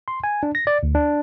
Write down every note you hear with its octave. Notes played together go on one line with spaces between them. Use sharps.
C6
G#5
D4
A#6
D5
D2
D4